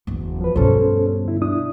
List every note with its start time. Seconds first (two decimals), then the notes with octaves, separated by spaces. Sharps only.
0.07 F#1 E2
0.41 F3 B4
0.56 G2 B2 C#4 A4 C5
1.25 D2 E4
1.42 D4 E4 D#6